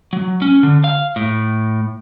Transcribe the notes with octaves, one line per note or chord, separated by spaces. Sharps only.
F#3
C#4
D3
F5
A2